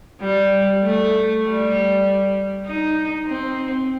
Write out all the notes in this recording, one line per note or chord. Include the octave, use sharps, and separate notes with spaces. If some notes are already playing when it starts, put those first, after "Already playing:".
G3
A3
G3
D#4
C4